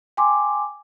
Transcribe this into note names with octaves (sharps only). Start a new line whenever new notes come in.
G5 G#5 C6 D6